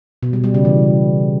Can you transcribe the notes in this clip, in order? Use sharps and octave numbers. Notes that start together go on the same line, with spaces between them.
B2
G3
G3
C#3
E3